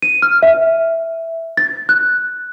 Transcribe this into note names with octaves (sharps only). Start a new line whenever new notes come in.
D#7
F6
E5
A6
F#6